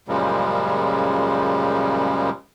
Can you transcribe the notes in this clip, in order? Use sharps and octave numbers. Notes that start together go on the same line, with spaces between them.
F#2 A#2 C#3 F3 G3 G#3